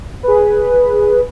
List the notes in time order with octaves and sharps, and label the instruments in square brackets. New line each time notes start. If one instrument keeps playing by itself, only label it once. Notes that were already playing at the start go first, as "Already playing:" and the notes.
[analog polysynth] G#4 B4